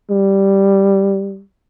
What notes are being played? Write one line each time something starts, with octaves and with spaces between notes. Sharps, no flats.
G3